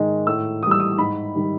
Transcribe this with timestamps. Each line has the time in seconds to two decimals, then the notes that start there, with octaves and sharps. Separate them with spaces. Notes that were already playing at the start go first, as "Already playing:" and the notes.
Already playing: G#2 D#3 G#3
0.27 A2 E6
0.63 E3 D#6
0.67 G3 E6
0.80 D#6
0.98 G#2 B5
1.35 D#3 G3